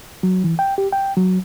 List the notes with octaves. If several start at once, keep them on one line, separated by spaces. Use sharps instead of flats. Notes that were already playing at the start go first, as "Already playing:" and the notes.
F#3
E3
G5
G4
G5
F#3